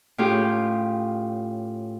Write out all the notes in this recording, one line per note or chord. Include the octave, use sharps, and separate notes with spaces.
A2 C#4 F4 G4 G#4